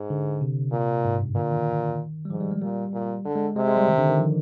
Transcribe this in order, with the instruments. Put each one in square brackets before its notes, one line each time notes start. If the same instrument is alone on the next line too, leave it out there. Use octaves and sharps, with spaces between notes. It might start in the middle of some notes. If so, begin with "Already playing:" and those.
Already playing: [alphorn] G#2
[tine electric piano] D3
C3
[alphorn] A#2
[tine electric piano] G#2
G2
[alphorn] A#2 [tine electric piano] D3
[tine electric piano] D#3
G3
[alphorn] G#2 [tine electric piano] F3
[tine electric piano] G3
G#3
[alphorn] A#2 [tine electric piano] G3
[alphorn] A#2
D3
[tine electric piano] G#3
[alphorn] C3 [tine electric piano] G#3
[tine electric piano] G#3
G3
D#3
D3
D#3
F3